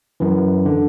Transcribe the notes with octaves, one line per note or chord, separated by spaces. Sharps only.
F#2 E3
D3